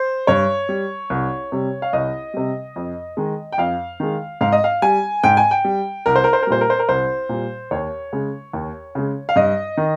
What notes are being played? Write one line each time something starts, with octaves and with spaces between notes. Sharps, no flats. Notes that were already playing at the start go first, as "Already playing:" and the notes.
Already playing: C5
G2 C#5
G3
C2
C3 G3
F5
C2 D#5
C3 G3
F2
D#3 G#3
G5
F2 F5
D#3 G#3
G#2 F5
D#5
F5
G3 G#5
G#2 G5
G#5
G5
G3
C2 A#4
C5
A#4
C5
A#4
A#2 G3 C5
A#4
C5
A#4
C2 C5
A#2 G3
D#2 C#5
C#3 G#3
D#2
C#3 G#3
F5
G2 D#5
D#3